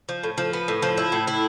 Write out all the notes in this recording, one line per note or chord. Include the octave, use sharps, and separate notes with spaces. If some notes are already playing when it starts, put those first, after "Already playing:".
F3
A2
F3
B3
A2
F3
E4
A2
E4